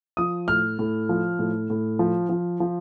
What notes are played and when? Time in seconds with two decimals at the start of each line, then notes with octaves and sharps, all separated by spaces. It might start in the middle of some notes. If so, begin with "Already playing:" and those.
0.17 F3 D#6
0.48 A2 F6
0.79 A2
1.09 F3
1.39 A2
1.70 A2
1.99 F3
2.29 F3
2.60 F3